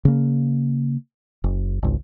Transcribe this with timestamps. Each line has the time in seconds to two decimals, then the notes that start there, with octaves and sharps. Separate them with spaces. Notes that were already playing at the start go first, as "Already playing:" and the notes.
0.05 C#3 A#3
1.44 F#1
1.83 G#1 C#2